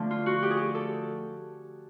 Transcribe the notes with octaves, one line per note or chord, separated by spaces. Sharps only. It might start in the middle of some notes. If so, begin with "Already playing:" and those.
Already playing: D3 F3 A3 D4
F4
F#4
G4
G#4
G4
A4